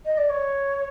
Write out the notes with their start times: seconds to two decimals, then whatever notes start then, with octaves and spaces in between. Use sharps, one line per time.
0.05 D#5
0.17 D5
0.29 C#5